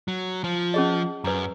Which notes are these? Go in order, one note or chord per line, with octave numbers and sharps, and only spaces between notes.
F#3
F3
C#4 G#4 D#5
F#2 B4 A#5